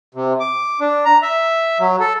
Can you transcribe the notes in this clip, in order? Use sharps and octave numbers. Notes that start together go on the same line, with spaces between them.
C3
D6
D4
A#5
E5
F#3
A4